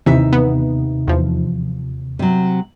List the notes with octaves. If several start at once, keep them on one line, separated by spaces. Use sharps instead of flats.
D#2 C3 E3 D#4 E5
B3
E2 F3
C3 F#3